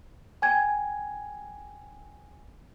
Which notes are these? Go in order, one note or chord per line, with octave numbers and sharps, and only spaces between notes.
G5 G#5 G#6